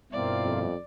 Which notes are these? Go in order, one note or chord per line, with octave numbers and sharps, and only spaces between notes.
G2 B2 A#3 C4 E4 F4 D5
F2